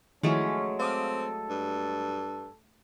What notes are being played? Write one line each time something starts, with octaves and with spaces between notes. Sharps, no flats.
D#3 F3 F#3 G#3 A3 C#4 E4
C4 A4 F5 D6 D#6
G2